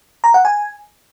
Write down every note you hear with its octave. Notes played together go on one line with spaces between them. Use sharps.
A#5
F#5
G#5